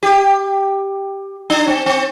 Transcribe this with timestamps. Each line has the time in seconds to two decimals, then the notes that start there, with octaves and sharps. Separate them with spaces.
0.03 G4
1.50 D4
1.67 C4
1.86 C4